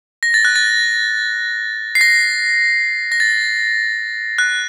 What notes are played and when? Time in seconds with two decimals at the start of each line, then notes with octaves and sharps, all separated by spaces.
0.23 A#6
0.34 A6
0.45 F#6
0.56 A6
1.95 C7
2.01 A#6
3.12 A#6
3.20 A6
4.38 F#6